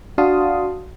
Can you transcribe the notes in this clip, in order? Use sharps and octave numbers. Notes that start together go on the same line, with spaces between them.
D4 F#4 F5 A5 C6 D#6